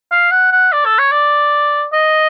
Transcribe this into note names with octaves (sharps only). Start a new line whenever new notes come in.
F5
F#5
F#5
D5
A4
C#5
D5
D#5